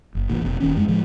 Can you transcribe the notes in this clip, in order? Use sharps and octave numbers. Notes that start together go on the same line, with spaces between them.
F#1
A1 D2 A#2
F1 B2
D#1 D#3 C#4
F#2 G3 G#3
A2 D3 F3 G#3